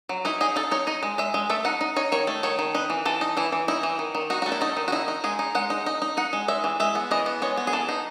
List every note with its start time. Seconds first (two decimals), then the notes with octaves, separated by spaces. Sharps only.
0.09 F#3
0.25 D#4 E4
0.41 D#4 G#4
0.56 D#4 A4
0.71 D#4 C#5
0.87 D#4 D#5
1.03 G#3
1.18 G#3 E5
1.34 G#3
1.50 A3 E5
1.65 D#4 F#5
1.81 D#4
1.96 D#4 C#5
2.12 D#3 C#5
2.27 A3
2.43 D#3 C#5
2.59 D#3
2.75 D#4 B4
2.90 E3
3.05 E3 A4
3.21 D#4
3.37 E3 E4
3.52 E3
3.68 D#4 E4
3.83 E3
3.99 D#3
4.15 D#3
4.30 D#4 F#4
4.42 A3 F#4
4.52 E4
4.61 A3 D#4
4.77 D#3
4.88 F#4
4.92 D#4 E4
5.08 D#4
5.24 G#3 G#4
5.39 D#4
5.55 G#3 F#5
5.70 D#4
5.86 D#4
6.02 D#4
6.17 D#4 F#5
6.33 G#3
6.48 G#3 E5
6.64 E3
6.80 G#3 E5
6.95 B3
7.11 E3 D#5
7.26 B3
7.42 G#3 C#5
7.57 B3
7.67 G#4
7.73 E3 A4
7.89 D#4